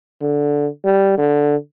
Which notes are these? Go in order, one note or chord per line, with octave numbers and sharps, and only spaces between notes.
D3
G3
D3